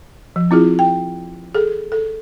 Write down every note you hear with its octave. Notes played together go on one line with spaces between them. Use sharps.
F3
C4 E4 F4 G#4
G5
G#4 A4
A4